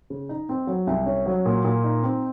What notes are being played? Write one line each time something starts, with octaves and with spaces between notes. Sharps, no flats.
C#3
D#4
C4
F#3
C2
C#4
F#3
A#2
A#2
D#4
C4